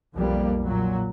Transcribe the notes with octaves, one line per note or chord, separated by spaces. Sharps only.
B1 F2 G3 A#3
A#2 F#3